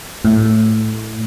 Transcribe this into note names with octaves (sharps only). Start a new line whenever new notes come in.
A2